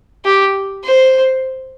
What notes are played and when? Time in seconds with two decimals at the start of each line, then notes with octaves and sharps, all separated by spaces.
0.25 G4
0.84 C5